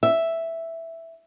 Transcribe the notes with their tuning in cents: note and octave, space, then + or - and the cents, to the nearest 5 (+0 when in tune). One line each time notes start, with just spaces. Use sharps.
E5 +0